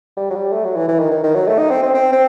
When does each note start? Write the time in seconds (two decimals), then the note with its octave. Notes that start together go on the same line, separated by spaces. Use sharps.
0.17 G3
0.30 F#3
0.35 G3
0.52 A3
0.64 F#3
0.76 E3
0.88 E3
0.99 D#3
1.11 D#3
1.24 D#3
1.35 F#3
1.47 A3
1.59 D#4
1.71 C4
1.83 C4
1.95 C4
2.12 C4